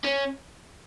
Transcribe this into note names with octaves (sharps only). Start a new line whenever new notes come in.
C#4